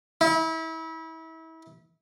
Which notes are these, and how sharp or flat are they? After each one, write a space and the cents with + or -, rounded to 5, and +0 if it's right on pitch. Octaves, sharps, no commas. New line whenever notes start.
E4 -30